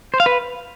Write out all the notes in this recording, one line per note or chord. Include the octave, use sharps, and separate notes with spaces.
C5
F5
B4